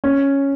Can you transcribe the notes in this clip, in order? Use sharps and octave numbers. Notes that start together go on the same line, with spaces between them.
C#4